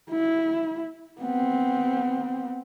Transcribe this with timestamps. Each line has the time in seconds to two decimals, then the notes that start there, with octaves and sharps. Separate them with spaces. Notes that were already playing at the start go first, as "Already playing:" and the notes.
0.11 E4
1.21 B3 C4